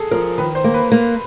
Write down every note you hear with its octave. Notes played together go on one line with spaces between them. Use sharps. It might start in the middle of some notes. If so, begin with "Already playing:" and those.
Already playing: G#4 A4
F3 A#4
D#3 B4
C5
A#3
B4
A#3